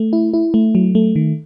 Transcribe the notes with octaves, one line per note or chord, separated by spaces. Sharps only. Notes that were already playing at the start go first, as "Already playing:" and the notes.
Already playing: A3
E4
E4
A3
F#3
A3
D#3